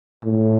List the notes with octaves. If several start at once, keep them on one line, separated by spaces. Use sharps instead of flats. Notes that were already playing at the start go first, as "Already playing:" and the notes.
A2